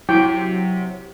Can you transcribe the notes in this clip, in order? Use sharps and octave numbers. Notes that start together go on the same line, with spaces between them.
F#3 E4 G4 C5 G5